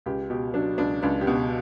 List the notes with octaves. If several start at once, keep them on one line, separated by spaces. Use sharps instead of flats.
C#2 G4
B2 G4
F#3 D4
C#2 D4
C#2 D4
G4
B2 F#4